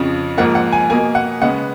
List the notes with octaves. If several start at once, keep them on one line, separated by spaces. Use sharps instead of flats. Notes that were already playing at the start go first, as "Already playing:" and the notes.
Already playing: F2 C#3 F3
G#2 F3 A#3 F#5
F#5
G#5
B2 A#3 G#5
F#5
C#3 G#3 B3 F#5